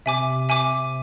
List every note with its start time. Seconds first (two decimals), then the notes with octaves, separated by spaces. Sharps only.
0.06 C3 E5 G#5 D6
0.49 E5 G#5 D6